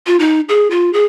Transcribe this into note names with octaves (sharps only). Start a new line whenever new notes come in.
F4
D#4
G#4
F4
G#4